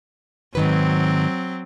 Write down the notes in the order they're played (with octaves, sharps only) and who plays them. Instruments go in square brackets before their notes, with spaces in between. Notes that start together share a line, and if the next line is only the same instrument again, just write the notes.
[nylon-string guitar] G#2 D#3 B4 [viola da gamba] F#3 C4